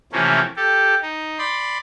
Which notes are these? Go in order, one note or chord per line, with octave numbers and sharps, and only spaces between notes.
C3 E3 F3 A3 A#3 C#4
G4 A4
D#4
D5 B5 C6